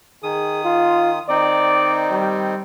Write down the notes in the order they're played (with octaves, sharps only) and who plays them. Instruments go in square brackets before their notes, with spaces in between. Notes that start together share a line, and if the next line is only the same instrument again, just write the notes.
[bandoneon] D#3 D#6 [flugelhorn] G#4
[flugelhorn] F4
[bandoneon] D#3 C4 D#4 [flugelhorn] D5
[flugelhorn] G3